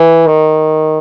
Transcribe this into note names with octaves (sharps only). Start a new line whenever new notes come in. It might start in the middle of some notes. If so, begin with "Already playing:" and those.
Already playing: E3
D#3